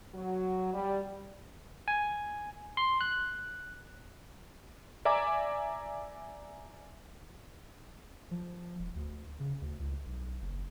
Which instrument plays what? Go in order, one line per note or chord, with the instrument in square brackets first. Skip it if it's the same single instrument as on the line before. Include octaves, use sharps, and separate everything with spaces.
[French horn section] F#3
G3
[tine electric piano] G#5
C6
F#6
[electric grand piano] D5 E5 G#5 A#5 D6
[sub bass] F3
D#1
D2
C#3
D2
C#2
B1
F#1